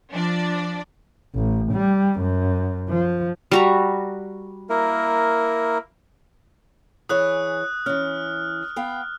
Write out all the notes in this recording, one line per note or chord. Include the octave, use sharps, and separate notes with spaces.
F3 D4 D5
A1
G3
F#2
F3
G3 F#4 A#5
A#3 E4 A#4
E3 G#4 C#5 D#6 F#6
E3 C#4 F6
B3 F5 G5